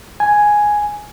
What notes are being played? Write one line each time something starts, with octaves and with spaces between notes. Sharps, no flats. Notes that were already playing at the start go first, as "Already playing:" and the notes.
G#5